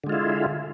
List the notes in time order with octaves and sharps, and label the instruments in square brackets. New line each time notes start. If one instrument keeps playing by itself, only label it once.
[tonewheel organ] D3
G#3
F4
E4